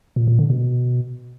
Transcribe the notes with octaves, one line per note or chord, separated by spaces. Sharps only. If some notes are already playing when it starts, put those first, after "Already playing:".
A#2
A#2
D3
B2